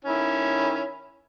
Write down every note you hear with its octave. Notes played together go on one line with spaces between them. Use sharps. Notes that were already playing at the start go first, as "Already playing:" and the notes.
D#3 C#4 E4